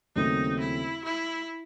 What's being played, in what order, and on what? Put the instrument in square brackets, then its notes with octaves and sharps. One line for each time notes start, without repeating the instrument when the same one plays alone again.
[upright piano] D#2 C#3 F#3 A3 C4 [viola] D#4
[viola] E4
E4